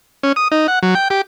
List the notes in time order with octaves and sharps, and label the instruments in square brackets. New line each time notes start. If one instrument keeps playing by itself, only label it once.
[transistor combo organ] C#4
D#6
D#4
F#5
F#3
G5
G4